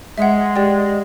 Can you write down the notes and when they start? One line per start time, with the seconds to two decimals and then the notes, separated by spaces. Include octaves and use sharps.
0.18 G#3 E5 F#5
0.56 G4 D5 G5